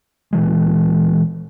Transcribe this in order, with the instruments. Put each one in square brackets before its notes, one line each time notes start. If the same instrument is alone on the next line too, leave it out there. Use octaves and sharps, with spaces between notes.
[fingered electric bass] A#2 E3 G#3